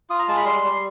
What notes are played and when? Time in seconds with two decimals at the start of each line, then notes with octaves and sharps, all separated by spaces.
0.10 F4 D#6
0.19 A#5
0.28 G#3 A5
0.37 B5
0.45 G3 C6
0.64 G3